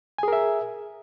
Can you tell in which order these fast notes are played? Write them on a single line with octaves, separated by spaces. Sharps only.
G#5 G#4 A#4 E5